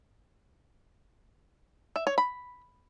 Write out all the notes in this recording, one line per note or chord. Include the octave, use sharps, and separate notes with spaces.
E5
C#5
B5